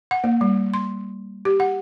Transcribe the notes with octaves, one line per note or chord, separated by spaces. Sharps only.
F#5
A#3
G3
C6
G4
F#5